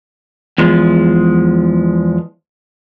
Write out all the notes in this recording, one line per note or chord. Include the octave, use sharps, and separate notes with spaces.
E2 F3 G#3